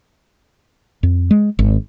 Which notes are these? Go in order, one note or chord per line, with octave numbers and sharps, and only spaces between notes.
F2
G#3
G#1